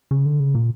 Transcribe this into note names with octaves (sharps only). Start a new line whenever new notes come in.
C#3
D3
C#3
A#2